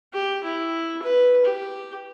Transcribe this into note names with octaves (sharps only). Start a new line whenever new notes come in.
G4
E4
B4
G4